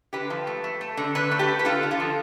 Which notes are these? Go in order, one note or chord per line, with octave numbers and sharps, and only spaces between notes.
D3 G4 B4
F3
A3
A3
A3
D3
D3 B4
A3
G4 B4
A3
B4
D3 F4 A4
D3
F4 A4
F3